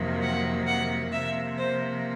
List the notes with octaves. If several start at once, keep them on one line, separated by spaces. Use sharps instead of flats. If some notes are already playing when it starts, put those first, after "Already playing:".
Already playing: F2 C3 D#3 F#3 A#3
F#5
F#5
C3 F3 A#3 E5
C5